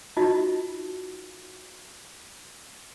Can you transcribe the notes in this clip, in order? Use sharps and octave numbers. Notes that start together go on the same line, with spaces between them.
D#4 F4 F#4 D#5